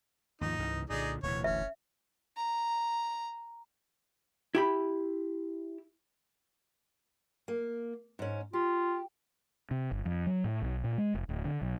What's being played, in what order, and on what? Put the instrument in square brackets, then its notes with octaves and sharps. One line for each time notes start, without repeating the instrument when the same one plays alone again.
[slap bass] D#2 F3 [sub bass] G#2 [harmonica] D#4
[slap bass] C#2 C#3 E3
[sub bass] C2 [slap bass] A#2 D3 [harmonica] D#4 G#4 D5
[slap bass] D1 D2 E3 [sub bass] B2 [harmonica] C#5
[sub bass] F#1 [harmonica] C#4 [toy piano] E5
[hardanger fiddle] A#5
[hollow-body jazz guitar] E4 G4 B5
[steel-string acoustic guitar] A#3
G#2 C#4
[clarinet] F4 [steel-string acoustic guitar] G4
[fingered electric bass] C3
G1
F2
F#3
A2
B1
A#2
G#3
F1
D1
D3
B1